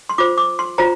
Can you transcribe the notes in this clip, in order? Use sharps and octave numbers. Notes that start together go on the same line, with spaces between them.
C6
F4 C5 D6
D6
C6
F4 C5 A#5